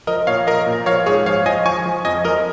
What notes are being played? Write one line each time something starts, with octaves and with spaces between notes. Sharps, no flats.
F3 A#4 D#5
A#2 C#5 F5
F3 A#4 D#5
A#2
F3 C#5 F5
G#2 G#4 C#5
F3 C#5 F5
F3 D#5 G#5
F3 G#5 C#6
F3
F2 D#5 G#5
F3 A#4 D#5